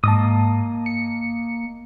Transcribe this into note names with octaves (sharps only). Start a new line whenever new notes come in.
G#2 A#3 D#5 A5 D#6
C#7